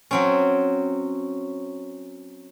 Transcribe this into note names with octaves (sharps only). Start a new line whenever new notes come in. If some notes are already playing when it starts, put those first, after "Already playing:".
F#3 C4 C#4